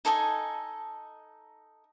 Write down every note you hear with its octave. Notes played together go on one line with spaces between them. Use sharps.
D#4 A4 D#5 G#5